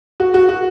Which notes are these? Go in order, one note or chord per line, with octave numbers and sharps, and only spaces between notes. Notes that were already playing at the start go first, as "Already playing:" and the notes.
F#4
F#4
F#4